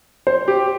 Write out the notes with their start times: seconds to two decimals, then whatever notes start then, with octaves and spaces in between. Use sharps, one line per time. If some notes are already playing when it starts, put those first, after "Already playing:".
0.27 C5
0.48 G4